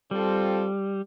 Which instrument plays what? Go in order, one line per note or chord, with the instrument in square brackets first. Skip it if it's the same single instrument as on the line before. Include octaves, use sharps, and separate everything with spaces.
[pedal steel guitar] G3 [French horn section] C4 F4 A4